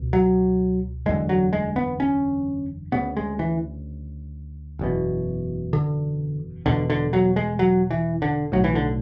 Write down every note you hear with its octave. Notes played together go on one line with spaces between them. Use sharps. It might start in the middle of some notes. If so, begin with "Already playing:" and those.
Already playing: C#2 B2
F#3
F#1 E2 D3 G#3
F#3
G#3
B3
C#4
D2 C#3 B3
G#3
E3
F#1 E2 B2
D3
E1 E2 B2 D3
D3
F#3
G#3
F#3
E3
D3
B1 A2 F#3
E3
D3